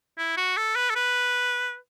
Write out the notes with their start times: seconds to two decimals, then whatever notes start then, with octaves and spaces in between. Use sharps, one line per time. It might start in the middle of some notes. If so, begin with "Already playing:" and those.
0.18 E4
0.37 F#4
0.57 A4
0.76 B4
0.90 A4
0.96 B4